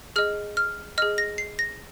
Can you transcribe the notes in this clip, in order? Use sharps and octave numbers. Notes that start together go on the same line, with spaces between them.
G#4 D#5 F6
F6
G#4 D#5 F6
A#6
C7
A#6